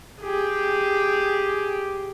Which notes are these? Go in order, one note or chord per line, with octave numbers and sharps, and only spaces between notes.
G4 G#4